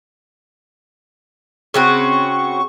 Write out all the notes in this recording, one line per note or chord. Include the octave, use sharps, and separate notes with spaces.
C#3 C4 F#4 C#6